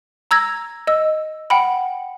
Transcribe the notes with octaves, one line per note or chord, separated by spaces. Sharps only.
A#5 E6 G#6 A#6
D#5 E6
F#5 G5 B5